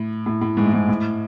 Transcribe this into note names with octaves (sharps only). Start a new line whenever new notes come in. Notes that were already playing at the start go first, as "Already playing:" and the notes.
Already playing: A2
A2
A2
G#2
A2
G#2
A2